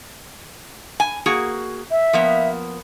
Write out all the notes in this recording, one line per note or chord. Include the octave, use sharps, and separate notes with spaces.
G#5
A#3 F#4 G#4
E5
F3 A#3 B3